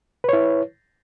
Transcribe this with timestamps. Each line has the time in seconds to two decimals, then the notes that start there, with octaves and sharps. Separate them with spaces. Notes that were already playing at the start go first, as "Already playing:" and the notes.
0.24 B4
0.29 C#5
0.33 E4